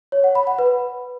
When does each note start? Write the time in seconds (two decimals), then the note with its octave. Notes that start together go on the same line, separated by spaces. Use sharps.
0.12 C#5
0.24 F#5
0.35 B5
0.47 F#5
0.59 B4